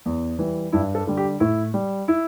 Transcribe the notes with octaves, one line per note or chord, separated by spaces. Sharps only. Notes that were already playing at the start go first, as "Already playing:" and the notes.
E2
E3 G3
G2 E4
A4
D3 G3
G4
A2 E4
G3
E4